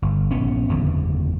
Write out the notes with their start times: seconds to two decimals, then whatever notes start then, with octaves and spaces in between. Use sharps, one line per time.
0.02 G1
0.31 A#1 B3 C#4
0.69 F#1 E2 D3